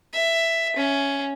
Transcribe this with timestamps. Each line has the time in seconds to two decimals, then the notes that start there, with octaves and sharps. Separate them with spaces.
0.13 E5
0.76 C#4